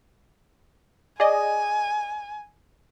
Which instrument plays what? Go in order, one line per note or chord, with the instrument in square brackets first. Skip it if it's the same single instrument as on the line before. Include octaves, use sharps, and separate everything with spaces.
[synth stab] G#4 D5 D#5 [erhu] G#5